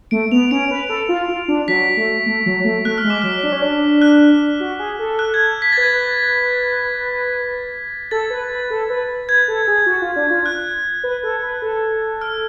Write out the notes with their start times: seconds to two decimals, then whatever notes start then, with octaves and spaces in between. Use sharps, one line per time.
0.11 A3 D7
0.31 B3 F7
0.51 C#4 D7
0.71 B4
0.89 A4
1.09 F4
1.28 F4
1.48 D4
1.68 F#3 B6
1.97 A3
2.26 A3
2.46 F#3
2.65 A3
2.85 A3 F#6
2.98 F6
3.04 G#3
3.10 D6
3.22 F#3 F6
3.43 D4
3.52 C#4
3.62 D4
4.02 F#6
4.60 F#4
4.79 G#4
4.99 A4
5.19 F#6
5.34 G#6
5.62 B6
5.72 A6
5.77 B4 G#6
8.11 A4 A6
8.30 B4
8.50 B4
8.70 A4
8.90 B4
9.29 B4 G#6
9.48 A4
9.68 G#4
9.86 F#4
10.01 F4
10.16 D4
10.31 F4
10.46 F#6
11.04 B4
11.23 A4
11.43 B4
11.62 A4
12.21 F6